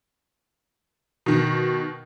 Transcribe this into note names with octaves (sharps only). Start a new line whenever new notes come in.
B2 D#3